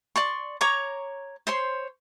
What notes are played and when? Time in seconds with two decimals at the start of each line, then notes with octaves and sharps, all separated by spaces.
0.16 D5 C6 C#6
0.61 C#5 A#5 C#6 D6
1.47 C5 C#5 C6